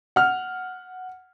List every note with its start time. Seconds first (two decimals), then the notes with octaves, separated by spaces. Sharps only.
0.16 F#5 F6